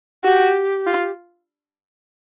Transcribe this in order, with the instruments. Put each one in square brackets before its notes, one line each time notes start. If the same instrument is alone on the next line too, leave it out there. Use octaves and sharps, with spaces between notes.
[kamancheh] F#4 [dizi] G4
[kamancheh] F4